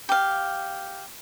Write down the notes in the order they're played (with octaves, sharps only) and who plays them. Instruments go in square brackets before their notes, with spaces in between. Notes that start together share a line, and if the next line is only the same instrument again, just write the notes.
[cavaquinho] G4 F5